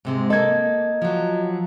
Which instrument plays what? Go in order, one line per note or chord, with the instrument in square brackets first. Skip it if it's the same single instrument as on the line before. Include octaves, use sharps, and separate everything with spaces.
[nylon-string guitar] G#2 C3 G#3
[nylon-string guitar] A#3 A4 [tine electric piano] D#5 G#6
[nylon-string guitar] F3 F#3